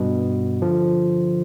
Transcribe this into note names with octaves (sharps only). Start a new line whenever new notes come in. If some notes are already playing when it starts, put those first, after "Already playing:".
Already playing: G2 B2
D3 F3